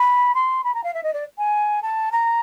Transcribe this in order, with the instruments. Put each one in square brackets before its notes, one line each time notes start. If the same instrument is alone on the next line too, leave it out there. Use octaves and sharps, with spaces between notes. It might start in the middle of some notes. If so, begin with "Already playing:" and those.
Already playing: [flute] B5
C6
B5
A#5
F5
E5
D#5
D5
G#5
A5
A#5